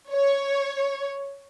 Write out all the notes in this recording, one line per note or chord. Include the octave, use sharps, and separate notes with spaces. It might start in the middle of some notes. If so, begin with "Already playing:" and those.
C#5